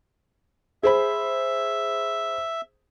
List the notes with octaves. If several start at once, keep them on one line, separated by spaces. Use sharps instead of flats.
G#4 C5 E5 B5